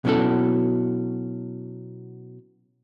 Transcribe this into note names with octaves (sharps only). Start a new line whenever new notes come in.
B2 F#3 C#4 E4 A4